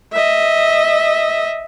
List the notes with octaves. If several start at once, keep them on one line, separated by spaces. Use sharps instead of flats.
D#5 E5